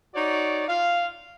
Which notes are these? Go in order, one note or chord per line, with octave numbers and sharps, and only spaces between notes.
D#4 F#4 C#5 D5
F4 F5